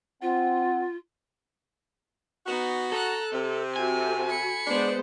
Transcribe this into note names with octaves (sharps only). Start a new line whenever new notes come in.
C4 F4 F#5
B3 D#4 F#4
A4 A#5 F#6
C3 C4
F#4 A4 G#5
B5 C#7
G#3 B3 D4 C5